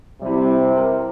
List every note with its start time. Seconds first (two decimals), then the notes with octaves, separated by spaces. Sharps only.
0.22 C3 G3 E4
0.77 A#4